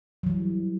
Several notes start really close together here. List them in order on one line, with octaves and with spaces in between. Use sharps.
F#3 E3 G3